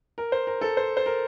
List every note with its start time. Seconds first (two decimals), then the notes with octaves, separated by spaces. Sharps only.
0.18 A#4
0.32 C5
0.47 A#4
0.61 A4
0.77 C5
0.97 C5
1.06 A#4